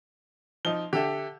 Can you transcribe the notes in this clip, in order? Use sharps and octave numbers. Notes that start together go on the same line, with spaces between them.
F3 D#4 G7
D3 G4 A4 E5